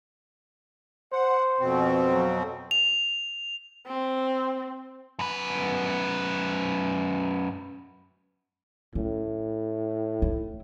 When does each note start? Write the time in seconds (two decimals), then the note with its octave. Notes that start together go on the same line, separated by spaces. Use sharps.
1.12 C5 F#5
1.60 F2 B2 C4
2.11 F#3
2.71 F7
3.87 C4
5.19 F#2 B4
8.95 A2 C#4
10.22 E4